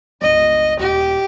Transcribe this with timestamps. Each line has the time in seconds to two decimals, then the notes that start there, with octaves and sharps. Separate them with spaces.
0.22 G1 C#2 D#5
0.79 D#1 G4